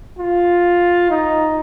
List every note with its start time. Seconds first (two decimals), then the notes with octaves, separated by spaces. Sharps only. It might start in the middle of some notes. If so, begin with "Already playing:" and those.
0.19 F4
1.10 D#4